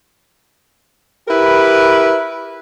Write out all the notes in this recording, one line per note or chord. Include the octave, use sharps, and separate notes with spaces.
E4 G4 A#4 B4